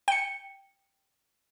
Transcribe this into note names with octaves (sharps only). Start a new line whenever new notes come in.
G5 C#7